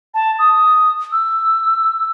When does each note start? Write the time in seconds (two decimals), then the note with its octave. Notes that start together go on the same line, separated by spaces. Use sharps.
0.14 A5
0.39 D#6
1.12 E6